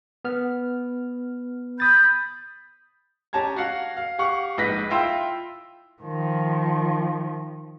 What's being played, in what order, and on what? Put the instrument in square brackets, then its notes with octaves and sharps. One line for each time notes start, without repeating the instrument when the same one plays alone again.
[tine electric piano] B3 F6
[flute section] B5 G6 [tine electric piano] D#6 A6
[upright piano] C#4 G4 A5 A#5 G#6
F#4 F5 F#5
F5
G4 F5 F#5 C#6
A#1 G#2 D#4 B4 A#6 B6
E4 F4 G5 C6 E6
[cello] D#3 F3